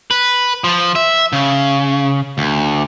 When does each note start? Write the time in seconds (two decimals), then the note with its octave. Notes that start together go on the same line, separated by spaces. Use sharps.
0.11 B4
0.64 F3
0.95 E5
1.33 C#3
2.38 D2